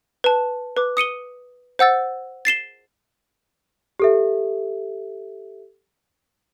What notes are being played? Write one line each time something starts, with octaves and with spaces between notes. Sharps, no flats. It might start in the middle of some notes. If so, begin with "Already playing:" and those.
B4 A5
B4 D6
D#6 C#7 D#7 G7
C5 F#5 E6 A6
A6 C7 E7 G7
G4 A4 E5